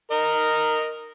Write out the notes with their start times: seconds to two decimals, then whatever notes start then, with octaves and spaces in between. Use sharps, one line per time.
0.11 A#4 D#5